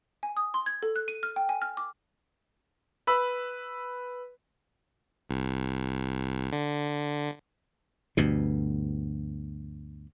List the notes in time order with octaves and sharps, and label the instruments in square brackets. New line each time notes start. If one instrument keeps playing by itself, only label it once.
[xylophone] G#5
D#6
C6
G#6
A4
F#6
D#7
F6
G5
G#5
F6
D6
[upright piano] B4 B5 E6
[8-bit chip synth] C2
D3
[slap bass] D2 G2 B2